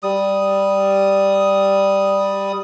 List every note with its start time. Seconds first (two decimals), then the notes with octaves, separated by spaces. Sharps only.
0.03 G3 D#6